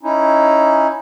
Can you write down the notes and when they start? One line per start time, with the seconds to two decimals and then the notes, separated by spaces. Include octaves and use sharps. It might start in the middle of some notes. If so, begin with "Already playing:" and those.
0.03 C#4 D#4 E4